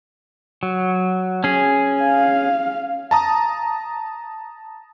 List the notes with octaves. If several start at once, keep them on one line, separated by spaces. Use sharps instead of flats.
F#3
C#4 G#4
F5
A5 A#5 D#6